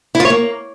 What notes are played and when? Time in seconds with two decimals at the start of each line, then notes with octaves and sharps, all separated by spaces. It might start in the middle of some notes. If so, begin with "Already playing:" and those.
0.15 E4
0.20 F4
0.25 C#5
0.30 A#3